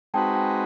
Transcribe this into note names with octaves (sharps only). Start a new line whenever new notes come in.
G#3 C4 D#4 F#4 B4 G5 A5
G5 A5